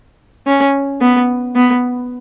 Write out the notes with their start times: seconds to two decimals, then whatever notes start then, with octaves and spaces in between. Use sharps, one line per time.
0.47 C#4
1.01 B3
1.56 B3